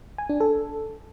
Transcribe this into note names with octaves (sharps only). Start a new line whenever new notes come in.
G#5
D4
A4